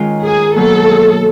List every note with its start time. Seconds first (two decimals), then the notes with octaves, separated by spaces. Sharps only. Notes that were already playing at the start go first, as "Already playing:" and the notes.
Already playing: D#3 G#3 C#4 F4
0.23 G#4
0.55 B2 F#3 A#3 A4